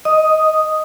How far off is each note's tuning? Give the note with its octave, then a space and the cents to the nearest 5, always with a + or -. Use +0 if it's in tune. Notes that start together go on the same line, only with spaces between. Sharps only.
D#5 +0 D#6 +0